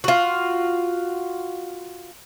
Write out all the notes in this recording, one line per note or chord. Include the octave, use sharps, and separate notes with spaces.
F4 F#4